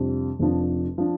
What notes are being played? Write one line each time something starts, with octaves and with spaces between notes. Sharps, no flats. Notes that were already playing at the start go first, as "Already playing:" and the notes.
Already playing: F2 C3 G3 D4
F1 F2 F3 D4
F3 D4